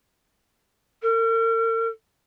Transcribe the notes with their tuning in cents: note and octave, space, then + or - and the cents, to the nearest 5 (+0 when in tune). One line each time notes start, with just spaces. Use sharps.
A#4 -45